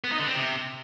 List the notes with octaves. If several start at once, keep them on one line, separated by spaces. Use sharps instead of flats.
B3
D#4
D3
C4
C3